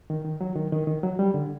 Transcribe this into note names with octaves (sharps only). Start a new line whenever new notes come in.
D#3
D#3
F#3
D#3
D#3
D#3
F#3
G3
D3